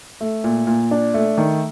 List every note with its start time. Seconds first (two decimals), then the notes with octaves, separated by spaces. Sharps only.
0.21 A3
0.44 A#2
0.67 A#2
0.91 D4
1.14 A3
1.38 D#3